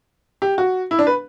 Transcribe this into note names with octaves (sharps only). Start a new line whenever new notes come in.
G4
F#4
E4
D4
B4